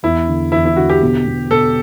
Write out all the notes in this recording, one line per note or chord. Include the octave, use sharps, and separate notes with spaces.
E2 E4
D3
E2 E4
E4
D3 F#4
G4
B2
B2
B2 A4